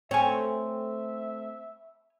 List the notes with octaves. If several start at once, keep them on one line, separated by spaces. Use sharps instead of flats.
A3 C4 C#5 E5 G#5